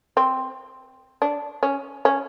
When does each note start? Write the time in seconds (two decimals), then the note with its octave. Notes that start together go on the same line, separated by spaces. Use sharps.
0.17 C4
1.22 D4
1.63 C#4
2.05 C#4